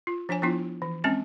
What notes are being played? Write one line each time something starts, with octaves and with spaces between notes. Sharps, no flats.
F4
F3 D4 C#5 G#5
F3 B3 D4 E4 F4
E3
G#3 C4 C#4 G#5